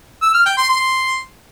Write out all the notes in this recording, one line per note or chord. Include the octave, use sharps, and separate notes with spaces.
E6
F6
G5
C6
C6